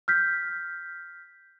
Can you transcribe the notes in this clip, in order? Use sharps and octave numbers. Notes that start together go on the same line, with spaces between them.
F6 G6 B6